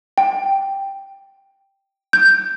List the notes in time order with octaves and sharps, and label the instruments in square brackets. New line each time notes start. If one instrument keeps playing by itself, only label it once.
[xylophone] G5
G6